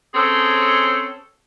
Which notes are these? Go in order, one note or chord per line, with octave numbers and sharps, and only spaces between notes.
C4 C#4 G#4 A4 C5